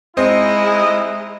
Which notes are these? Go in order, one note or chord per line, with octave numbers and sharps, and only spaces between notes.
G#3 C4 D#4 E4 D#5